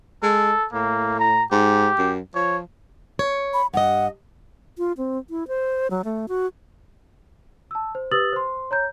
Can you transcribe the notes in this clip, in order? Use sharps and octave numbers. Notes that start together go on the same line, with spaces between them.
G#3 A4
A2 A#3
A#5
G#2 G4
F#2
F3 C#5
C#5
B5
G2 D#5 F#5
F4
C4
E4
C5
F#3
A3
F#4
A5 E6
C5
G4 B4 D#6 E6 A6 F#7
C5 C6
C#5 A#5 G6